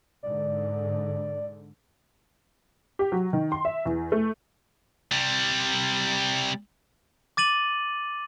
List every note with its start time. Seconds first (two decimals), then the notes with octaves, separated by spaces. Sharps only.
0.23 G#2 D3 D5
2.99 G4
3.12 F#3
3.33 D#3
3.52 C6
3.65 E5
3.85 E2
4.12 A3
5.12 C3 G3
7.37 D6 A6 D#7 F#7